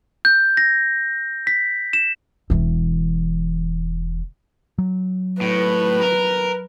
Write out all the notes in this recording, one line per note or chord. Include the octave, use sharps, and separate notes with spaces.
G6
A#6
B6
E7
E1 E3
F#3
A2 B4
A#4